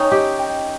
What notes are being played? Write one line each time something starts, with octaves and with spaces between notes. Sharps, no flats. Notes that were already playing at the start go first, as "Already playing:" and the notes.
Already playing: C#4 D#4 G5
G4 D#5
G5